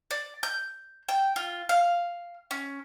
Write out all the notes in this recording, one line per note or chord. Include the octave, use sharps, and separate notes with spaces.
D5
G6
G5
F4
F5
C#4